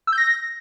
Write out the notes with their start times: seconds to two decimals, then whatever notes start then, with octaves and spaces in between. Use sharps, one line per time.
0.07 E6
0.13 G6
0.18 A#6